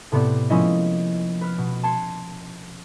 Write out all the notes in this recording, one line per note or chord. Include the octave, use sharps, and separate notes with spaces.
A2 C3 B3 C4 D5
F3 G#3 A#3 C#4 E4 D#5
B4 F6
B2
A5 C6 G#6 C#7